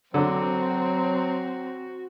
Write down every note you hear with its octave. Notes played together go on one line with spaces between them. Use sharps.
D3 F#3 C4 F#4